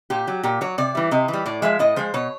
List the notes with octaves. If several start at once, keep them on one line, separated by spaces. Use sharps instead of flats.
A#2 G4
F#3
A#2 G4
F#3 C#5
C3 D5
E3 G3
C3 D#5
E3
G3
A2 D5
F3 G#3 E5
A2 D#5
F3 G#3 C5
B2 C#5